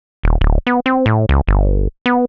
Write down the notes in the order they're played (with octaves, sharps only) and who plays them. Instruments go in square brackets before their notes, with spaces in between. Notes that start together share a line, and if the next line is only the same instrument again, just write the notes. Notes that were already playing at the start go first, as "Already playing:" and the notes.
[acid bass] D#1
D1
B3
C4
A2
C#2
G1
B3